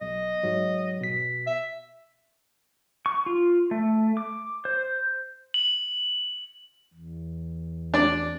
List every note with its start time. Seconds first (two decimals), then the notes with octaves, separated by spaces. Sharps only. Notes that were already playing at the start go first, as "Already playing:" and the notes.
0.01 B1 D#5
0.43 G#2 F#3
1.01 B2 B6
1.47 E5
3.06 C#6
3.26 F4
3.71 A3
4.17 D6
4.65 C5
5.54 F#7
6.94 E2
7.94 D4 D5